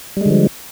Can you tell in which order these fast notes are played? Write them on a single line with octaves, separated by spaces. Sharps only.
G3 G#3 D3 F3